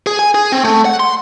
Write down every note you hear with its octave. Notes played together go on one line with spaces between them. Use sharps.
G#4
G#5
G#4
C4
A3
F#5
C6